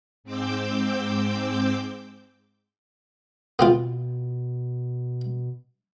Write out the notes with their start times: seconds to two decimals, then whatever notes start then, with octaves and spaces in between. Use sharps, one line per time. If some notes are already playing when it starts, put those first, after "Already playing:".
0.24 G#2 C4 D6 E6 G6
3.59 B2 B3 C4 F4